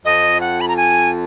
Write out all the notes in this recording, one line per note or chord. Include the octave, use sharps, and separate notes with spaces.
F2 D#5
F#5
B5
A#5
G#5